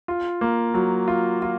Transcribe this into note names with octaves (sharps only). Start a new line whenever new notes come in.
F4
A#3
F#3
F4
F4